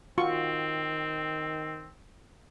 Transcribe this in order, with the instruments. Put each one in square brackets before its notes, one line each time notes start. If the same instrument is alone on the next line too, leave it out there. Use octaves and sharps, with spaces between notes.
[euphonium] D#3 [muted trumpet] C4 [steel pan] F4 F#4 C#6